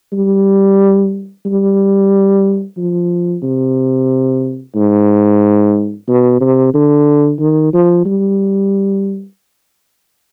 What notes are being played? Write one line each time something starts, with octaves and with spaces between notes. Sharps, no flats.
G3
G3
F3
C3
G#2
B2
C3
D3
D#3
F3
G3